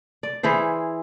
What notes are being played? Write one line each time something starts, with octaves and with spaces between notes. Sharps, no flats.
D5
E3 E4 G#4 C5